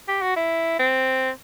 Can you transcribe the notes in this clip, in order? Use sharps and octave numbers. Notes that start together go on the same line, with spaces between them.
G4
F#4
E4
C4